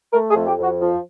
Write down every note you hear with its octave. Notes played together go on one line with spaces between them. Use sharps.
A3 A#4
G#4
F2
G4
F2 F#4
F3